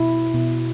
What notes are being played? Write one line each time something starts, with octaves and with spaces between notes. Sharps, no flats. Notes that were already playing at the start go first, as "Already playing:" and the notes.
Already playing: B2 E4
B2